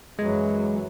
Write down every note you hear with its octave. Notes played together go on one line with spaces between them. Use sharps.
F#2 E3 F#3 G#3